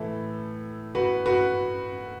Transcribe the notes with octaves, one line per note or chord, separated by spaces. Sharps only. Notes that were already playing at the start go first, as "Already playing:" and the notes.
Already playing: A2 E3 E4 A4
F#4 B4
F#4 B4